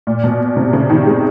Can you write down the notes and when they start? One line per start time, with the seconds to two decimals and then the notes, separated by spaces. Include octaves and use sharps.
0.07 A#2
0.24 B2
0.57 C3
0.73 C#3
0.90 D#3
1.06 G#3